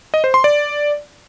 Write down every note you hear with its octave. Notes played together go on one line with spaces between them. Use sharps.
D#5
C5
C6
D5